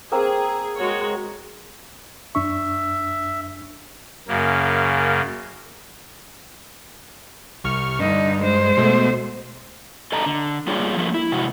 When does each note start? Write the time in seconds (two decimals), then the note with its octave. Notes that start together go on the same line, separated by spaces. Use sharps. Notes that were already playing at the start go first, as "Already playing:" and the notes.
0.12 A#3 C4 G#4 E6
0.77 G#3 F#4 C#5
2.35 F#2 D4 E5 C#6
4.28 F#2 C#3 A#3
7.64 C2 C#6 F6
8.00 G2 D3 D#4
8.41 G#3 C5
8.77 B2 A3
10.12 A4 D5 D#5 A5 A#5
10.26 D3
10.67 G3 A#3 F4 G#4 C#5 D5
10.97 F3 A3 A#3
11.14 E4
11.32 C3 G#3 E4 F#4